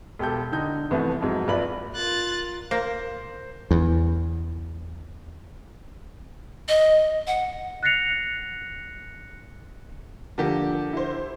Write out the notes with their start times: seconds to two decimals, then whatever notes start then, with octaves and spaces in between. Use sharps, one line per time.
0.19 E1 G4 A4 G6
0.52 D3 D#4 G6
0.91 C2 F2 E3 A3 B3
1.21 F2 G#2 F#3
1.48 A#1 F4 B4 D5 B5 F#7
1.95 F4 A#4 F#6 A6
2.71 A#3 C5
3.71 E2
6.68 D#5
7.27 F#5
7.83 F#6 A6 A#6 C7 C#7 F7
10.38 D3 F3 A#3 G4
10.93 E4 C5